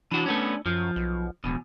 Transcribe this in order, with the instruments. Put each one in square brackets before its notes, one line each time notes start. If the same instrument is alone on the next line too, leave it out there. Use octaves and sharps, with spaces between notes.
[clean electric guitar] E3 F#4 [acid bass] D4
[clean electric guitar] A3 B3 C#4
[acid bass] F#2 [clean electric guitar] F3
[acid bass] B1
[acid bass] D1 [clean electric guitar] E2 B2